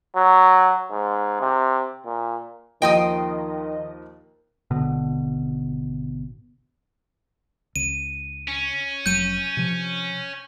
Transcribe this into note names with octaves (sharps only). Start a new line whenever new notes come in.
F#3
G#2
C3
A#2
D#2 D#3 F3 D#5 G5 C6 D#6
G#1 B2 D3
C#2 D#7
C#4
F1 F#3 G6 D#7
C3 F3